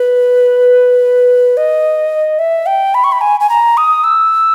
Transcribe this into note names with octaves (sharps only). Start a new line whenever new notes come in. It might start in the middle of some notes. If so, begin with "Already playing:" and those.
Already playing: B4
D#5
E5
G5
B5
C#6
B5
G#5
G#5
A#5
D#6
E6